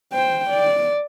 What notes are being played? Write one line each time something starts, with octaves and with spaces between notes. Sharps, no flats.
C5 G5
D5